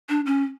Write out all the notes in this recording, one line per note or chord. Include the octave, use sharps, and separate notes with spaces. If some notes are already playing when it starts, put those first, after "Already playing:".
D4
C#4